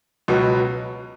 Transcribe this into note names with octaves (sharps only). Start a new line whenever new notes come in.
C#2 B2 F#3 B3